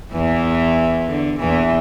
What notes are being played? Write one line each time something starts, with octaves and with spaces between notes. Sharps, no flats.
E2 E3
D3
E2 E3